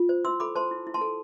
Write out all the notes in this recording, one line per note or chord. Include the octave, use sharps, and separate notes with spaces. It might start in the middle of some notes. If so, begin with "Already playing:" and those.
Already playing: F4
C5
E4 C6 E6
A4 B5 D6
C5 A5 C6
E4
E4
A5 C6
A4